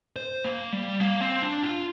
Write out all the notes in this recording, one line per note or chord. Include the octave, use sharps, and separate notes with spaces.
C5
A#3
G3
A#3
C4
D4
F4